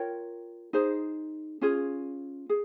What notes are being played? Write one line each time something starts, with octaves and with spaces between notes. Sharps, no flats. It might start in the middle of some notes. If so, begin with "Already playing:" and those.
Already playing: F4 A#4 C#5 G5
D#4 G#4 C5
C#4 F4 G#4
G#4